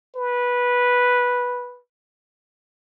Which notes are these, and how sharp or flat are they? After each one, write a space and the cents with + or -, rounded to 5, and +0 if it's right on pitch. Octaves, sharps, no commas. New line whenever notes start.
B4 -10